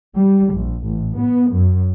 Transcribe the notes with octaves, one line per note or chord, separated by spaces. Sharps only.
G3
A#1
A1
B3
F#2